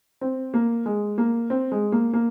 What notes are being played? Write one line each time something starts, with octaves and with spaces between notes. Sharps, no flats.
C4
A#3
G#3
A#3
C4
G#3
A#3
A#3